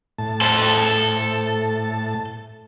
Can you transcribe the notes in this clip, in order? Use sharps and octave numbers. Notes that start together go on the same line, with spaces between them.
A2 A5
A4 C5